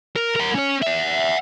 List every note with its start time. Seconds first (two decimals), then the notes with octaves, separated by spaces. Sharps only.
0.16 A#4
0.36 A#4 F#5
0.56 C#4 C#5
0.83 E5 F#5